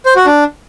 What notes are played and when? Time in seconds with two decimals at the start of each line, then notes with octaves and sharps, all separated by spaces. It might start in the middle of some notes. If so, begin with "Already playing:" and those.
0.06 C5
0.16 F#4
0.26 D4